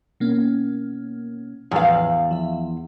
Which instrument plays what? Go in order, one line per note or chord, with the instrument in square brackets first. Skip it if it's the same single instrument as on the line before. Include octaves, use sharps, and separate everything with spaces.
[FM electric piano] B2 A#3 C#4
[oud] E2 F5 [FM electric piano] A2 F3 B4
[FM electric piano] F3 E5